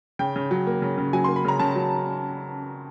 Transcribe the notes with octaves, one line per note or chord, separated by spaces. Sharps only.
C#3 G5
C#3
F#3
A#3
C#3
C#3
F#3 G#5
C6
A#3
B5
C#3 A#5
C#3 A5
F#3